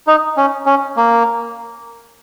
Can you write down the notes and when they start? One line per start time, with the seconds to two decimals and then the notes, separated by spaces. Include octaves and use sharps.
0.07 D#4
0.37 C#4
0.66 C#4
0.97 A#3